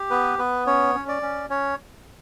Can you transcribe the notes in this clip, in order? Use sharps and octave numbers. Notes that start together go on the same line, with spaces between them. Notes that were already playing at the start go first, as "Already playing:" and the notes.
Already playing: G4
B3 B4
B3 B4
C#4 C#5
C#4
D5
C#4
C#4 C#5